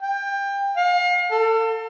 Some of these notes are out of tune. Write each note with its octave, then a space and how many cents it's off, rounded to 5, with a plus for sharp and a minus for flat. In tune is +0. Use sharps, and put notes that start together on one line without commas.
G5 +25
F5 +35
A4 +30